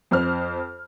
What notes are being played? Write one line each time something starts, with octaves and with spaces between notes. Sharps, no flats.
F2 C5 F6